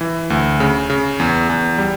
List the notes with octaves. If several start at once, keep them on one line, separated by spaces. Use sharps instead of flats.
E3
D2
C#3
C#3
E2
E2
G3